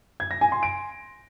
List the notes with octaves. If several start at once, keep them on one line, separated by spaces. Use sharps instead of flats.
G#6
A#6
G#5
C6
D7